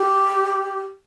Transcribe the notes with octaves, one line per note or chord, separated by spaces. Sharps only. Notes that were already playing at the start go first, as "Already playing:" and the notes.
Already playing: G4